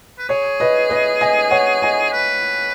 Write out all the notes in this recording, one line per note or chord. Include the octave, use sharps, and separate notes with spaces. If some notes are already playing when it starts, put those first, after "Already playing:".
B4
G#4 C#5
B4 D#5
B4 D#5
D#5 G#5
C#5 F#5
D#5 G#5
B4